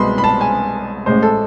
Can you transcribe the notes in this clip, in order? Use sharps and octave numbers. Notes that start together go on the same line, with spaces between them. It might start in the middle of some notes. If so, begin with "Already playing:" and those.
Already playing: C2 B2 G#3 B3 B5 C6
B5
A5
G#5
A1 A2 G#3 C5
A4